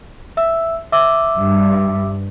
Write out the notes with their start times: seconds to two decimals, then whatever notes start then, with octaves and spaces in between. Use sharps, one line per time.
0.37 E5 E6
0.92 E5 D6 E6
1.35 G2